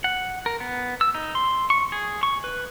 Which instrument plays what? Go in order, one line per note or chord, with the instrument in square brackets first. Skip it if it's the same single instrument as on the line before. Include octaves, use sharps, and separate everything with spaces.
[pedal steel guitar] F#5
A#4
B3
E6
D#4
C6
C#6
G#4
C#6
B4